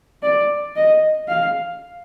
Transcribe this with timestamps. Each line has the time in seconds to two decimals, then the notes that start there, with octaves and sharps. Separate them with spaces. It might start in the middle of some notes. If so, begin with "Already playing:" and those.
0.23 D5
0.76 D#5
1.28 F5